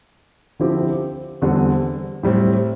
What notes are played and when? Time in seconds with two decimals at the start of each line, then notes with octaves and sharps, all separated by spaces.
0.60 D3 F3 C4 E4 G4
1.42 E2 D3 G3 C4
2.23 A2 G3 C4